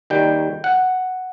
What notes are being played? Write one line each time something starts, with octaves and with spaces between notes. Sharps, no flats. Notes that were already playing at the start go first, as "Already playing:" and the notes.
D#2 D#3 G3 G5
F#5